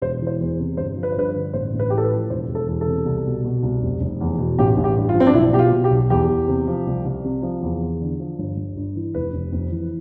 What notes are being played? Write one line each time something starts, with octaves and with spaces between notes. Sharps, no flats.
E1 C5
E3
C5
E2
C3
G1 C5
F3
B4
C5
G2 B4
B4
D3
A1 C5
A1
B4
A2 G4
A4
B4
F3
E1 C5
E1
A4
E2
A4
C3
C2
B2
B2
C2
F1
F1
E2
B2
A1 G4
A1
G4
G2
F4
F3
C4
D4
B1 E4
B2 G4
F4
B2
G4
B1
E2 G4
E2
C3
F3
C2
C2
C3
F3
E2
E2
D3
F3
G1
G1
G2
E3
F1 B4
F1
F2
E3